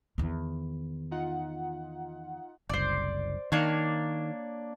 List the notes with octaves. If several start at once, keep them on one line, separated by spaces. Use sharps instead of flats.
E2 D#3
D#4 F4 F#5
F#1 C2 C5 D5
D#3 A#3 D4 C#5